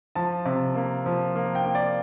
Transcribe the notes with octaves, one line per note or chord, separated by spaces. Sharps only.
F3 A5
C3
A#3
F3
A#3
G5
A#3
D5